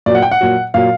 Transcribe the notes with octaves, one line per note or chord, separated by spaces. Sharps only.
A#2 F#3 D5
F#5
G5
F#5
A#2 F#3
A#2 F#3 F5